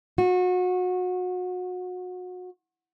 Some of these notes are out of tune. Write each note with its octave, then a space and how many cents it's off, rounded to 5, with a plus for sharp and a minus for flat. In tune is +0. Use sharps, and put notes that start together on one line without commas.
F#4 -30